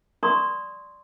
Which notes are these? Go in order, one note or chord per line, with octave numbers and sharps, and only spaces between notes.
D5 A#5 C6 C#6 D#6